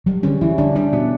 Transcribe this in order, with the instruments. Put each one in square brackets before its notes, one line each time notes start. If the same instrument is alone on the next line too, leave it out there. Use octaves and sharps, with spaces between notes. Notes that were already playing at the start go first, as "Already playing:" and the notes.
[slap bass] F#3 [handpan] G3
[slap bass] D3 [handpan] C#4
[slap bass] E3 [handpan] E4
[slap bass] D3 [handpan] D4
[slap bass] G3 [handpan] D4
[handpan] B2 [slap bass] B3